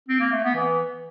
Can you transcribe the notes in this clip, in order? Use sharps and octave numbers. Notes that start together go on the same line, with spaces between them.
C4
A#3
A3
B3
E3